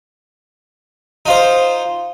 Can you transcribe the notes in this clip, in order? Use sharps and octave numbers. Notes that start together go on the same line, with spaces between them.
D#4 F4 C5